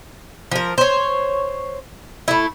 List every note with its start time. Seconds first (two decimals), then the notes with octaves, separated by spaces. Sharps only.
0.51 F3 A#4
0.78 C5 C#5
2.28 A3 E4